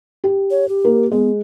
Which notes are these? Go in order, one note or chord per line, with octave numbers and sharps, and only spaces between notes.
G4
C#5
G4
A#3
G#3 B3